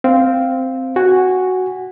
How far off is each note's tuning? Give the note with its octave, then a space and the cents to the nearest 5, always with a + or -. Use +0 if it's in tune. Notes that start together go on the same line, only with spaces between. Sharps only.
C4 -5 F5 +0
F#4 +0 G#5 -20